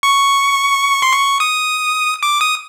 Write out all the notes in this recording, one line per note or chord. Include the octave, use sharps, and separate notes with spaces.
C#6
C6
C#6
D#6
D6
D#6